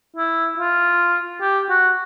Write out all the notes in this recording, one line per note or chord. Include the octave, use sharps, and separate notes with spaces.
E4
F4
G4
F#4